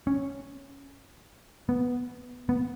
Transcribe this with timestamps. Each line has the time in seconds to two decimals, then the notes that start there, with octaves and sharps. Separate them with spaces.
0.07 C#4
1.69 B3
2.49 B3